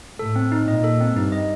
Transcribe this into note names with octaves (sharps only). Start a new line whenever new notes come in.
A2 A4
C4
D#4
A#2 D#5
A4
C4
G2 D#4
D#5